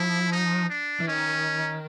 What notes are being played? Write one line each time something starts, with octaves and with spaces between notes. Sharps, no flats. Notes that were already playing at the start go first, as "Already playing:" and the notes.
Already playing: F3 E4
D#4
D4
E3
D#3 C#4